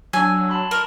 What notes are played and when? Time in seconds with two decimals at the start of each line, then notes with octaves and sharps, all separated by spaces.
0.13 F#3 D4 G#5 E6
0.49 A5 B5 C6
0.71 A#4